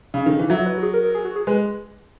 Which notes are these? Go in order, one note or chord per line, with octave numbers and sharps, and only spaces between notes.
C#3
D#3
E3
F#3 E5
D#5
B4
F#4
G#4
A#4
A#4
G#4
F#4
G#4
G#3 B4